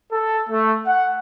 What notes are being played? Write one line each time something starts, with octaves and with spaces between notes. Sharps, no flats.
A4
A3
F#5